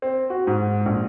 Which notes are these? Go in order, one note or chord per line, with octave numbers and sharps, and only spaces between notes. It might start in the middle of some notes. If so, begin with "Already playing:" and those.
C4
F#4
G#2
A#1